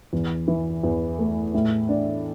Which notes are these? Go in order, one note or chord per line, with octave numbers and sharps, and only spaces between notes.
E2
E3
E2
A3
A2
D4